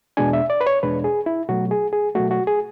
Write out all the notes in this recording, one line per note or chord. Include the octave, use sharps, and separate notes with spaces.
E2 B2 G#3 D4 G#5
E5
D5
B4
C#5
E2 B2 G#3 D4 B4
G#4
E4
B2 F#3 A3 F#4
G#4
G#4
B2 F#3 A3 F#4
F#4
G#4